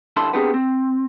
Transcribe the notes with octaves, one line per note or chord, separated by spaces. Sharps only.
G2 D3 E4 A5 C6
B3 C4 D4 G4 G#4
C4